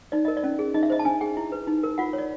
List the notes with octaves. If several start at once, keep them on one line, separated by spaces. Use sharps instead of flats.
D#4 D5
A#4 D#5
D5
C#4
G#4
D#4 D#5
E5
C5 D#5
A5
D4 G#5
G#4 G5
E4
B4
D#4
A#4
F4 F#5
C#5
D5